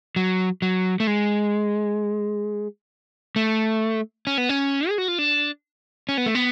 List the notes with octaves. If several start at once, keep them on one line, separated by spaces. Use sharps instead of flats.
F#3
F#3
A3
G#3
A3
C#4
B3
C#4
G#4
F#4
F4
D4
C#4
B3
A3
B3